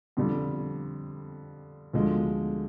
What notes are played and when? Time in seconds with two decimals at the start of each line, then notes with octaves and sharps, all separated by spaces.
0.17 F2 D3 G3
1.93 D2 D3 F3 G#3